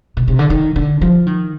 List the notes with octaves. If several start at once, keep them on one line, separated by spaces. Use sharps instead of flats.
B2
C3
D3
D#3
D3
F3
D#3